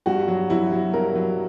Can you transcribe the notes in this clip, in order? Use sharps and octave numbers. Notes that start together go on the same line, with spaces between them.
G2 F#4
F#3
F#3 E4
F#3
G2 A#4
F#3